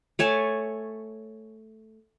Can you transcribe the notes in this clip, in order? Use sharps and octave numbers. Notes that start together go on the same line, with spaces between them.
A3 C#5 G#5 A5